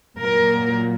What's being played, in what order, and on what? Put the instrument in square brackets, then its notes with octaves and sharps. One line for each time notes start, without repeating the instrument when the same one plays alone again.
[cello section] A#2 F#3 A#3 A#4